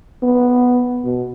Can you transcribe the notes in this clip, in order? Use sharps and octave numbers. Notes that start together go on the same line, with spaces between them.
B3
B2